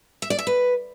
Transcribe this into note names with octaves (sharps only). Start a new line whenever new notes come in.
E5
D5
E5
B4